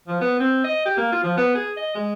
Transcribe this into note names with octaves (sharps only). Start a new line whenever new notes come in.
F3
B3
C4
D#5
G4
A#3
F4
F3
B3
G#4
D#5
G#3